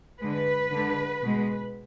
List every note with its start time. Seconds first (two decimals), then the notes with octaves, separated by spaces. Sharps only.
0.20 D3 G#3 B4
0.72 D3 G#3
1.23 B2 G#3